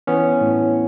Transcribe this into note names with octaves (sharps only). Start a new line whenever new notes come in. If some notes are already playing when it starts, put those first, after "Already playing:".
E3 B3 C#4
A2